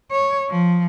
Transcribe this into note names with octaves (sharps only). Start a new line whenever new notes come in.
C#5
F3